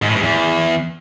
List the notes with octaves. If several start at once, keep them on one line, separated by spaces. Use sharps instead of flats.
G#2
A2
G2
E2